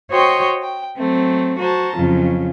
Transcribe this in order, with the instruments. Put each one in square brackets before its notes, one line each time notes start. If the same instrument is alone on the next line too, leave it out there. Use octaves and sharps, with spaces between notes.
[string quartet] F#4 C5 C#5 D#5 G5 C6
G5
F#3 A3 C4
F#4 C5 A5 A#5
F2 C#3 F#3 F4